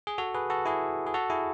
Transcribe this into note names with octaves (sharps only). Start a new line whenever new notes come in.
G#4
F#4 A4
G#4 B4
F#4 A4
E4 G#4
G#4
F#4 A4
E4 G#4